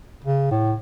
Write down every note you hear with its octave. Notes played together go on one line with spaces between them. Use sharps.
C#3
A2